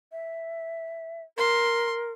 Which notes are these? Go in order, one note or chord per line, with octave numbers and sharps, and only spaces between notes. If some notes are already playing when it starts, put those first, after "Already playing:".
E5
A#4 C6